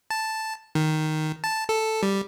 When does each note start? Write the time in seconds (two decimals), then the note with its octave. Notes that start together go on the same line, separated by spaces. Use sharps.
0.10 A5
0.75 D#3
1.44 A5
1.69 A4
2.03 G3